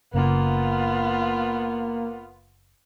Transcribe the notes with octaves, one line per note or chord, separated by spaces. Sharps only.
F#1 C#3 A#3 B3 F4